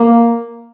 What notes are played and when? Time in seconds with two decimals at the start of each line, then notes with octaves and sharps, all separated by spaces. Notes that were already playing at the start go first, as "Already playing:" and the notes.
Already playing: A#3